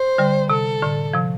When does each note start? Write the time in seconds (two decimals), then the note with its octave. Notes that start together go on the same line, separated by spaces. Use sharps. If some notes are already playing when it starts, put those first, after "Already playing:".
Already playing: C5
0.18 D3 G3
0.50 C3 A4
0.82 A2 D3
1.14 C3 F3